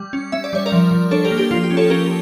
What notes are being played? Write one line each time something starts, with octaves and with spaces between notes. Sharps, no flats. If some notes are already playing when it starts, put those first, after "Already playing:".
Already playing: G3
C#4
C#4 E5
D5
G3 C#5
A#4 D5
F3
F3
D4 A4 C#5
G4 A#4
A#3
G4
F3 F4
G4
C#4
A4 C#5
C#4 G4 A#4